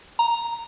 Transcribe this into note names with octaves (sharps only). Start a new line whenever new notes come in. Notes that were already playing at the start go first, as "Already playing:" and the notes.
A#5